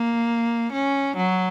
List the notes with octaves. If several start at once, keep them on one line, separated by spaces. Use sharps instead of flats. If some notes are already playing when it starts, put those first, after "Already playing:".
Already playing: A#3
C#4
F#3